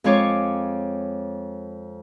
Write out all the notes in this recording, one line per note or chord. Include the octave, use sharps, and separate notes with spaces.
F2 G#3 F4 C#5 C#6 D6